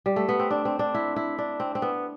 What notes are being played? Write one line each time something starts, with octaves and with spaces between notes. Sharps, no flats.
G3
A3
B3
C4
D4
C4
D4
E4
E4
D4
C4
C4
B3